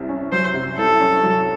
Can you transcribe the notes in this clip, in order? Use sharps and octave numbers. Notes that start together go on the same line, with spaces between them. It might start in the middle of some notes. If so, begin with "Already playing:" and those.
Already playing: C2 C3
C#4
F#3 C5
C3
C2 A4
C#4
F#3